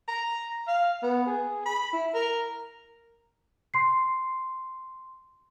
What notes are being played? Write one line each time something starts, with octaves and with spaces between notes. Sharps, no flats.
A#5
F5
B3
G#4
B5
E4
A#4
C6 C7